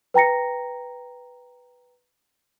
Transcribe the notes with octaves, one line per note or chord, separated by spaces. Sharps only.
B4 G5 A#5 A#6 C#7